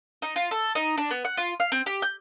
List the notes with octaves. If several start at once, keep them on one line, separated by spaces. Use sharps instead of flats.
D#4
F4
A4
D#4
D4
B3
F#5
F4
F5
C4
G4
G6